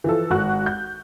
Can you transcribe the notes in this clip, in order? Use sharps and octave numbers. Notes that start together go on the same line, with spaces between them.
E3 F3 A4
G#1 F#4 F#6
G6